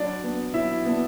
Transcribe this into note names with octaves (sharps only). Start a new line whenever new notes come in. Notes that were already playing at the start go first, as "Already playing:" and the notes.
Already playing: F#3 D4 D5
B3 D4
F#3 E4 E5
B3 D4